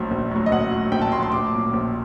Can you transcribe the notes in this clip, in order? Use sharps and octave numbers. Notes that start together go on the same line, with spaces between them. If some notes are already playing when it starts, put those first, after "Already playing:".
Already playing: A#1 A2 F#3
A#1
A2 F#3
D#5
A#1 F#5
A2 F#3
A#1 G5
A5
A2 F#3 C6
C6
A#1 D6
A#2 F#3
A#1